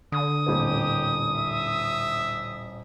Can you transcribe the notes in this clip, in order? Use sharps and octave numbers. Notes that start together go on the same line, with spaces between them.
D3 D#6
D#1 A1 C4 G4
E5